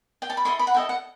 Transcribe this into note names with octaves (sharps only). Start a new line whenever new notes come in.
G5
A5
B5
E4 A4 D#5 C6
B5
F#5
E4 A4 D#5 G5
F#5